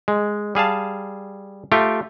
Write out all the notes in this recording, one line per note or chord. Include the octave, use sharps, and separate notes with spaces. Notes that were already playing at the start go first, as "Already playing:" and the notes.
G#3
G3 G#4 F5 A5
A3 F4 G4 G5